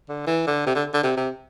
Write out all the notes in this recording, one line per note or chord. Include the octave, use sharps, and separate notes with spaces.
D3
E3
D3
C3
D3
D3
C3
C3